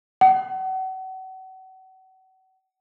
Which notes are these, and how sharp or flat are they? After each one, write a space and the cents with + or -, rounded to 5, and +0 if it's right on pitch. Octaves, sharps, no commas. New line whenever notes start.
F#5 +35